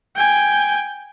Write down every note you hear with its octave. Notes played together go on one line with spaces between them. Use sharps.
G5 G#5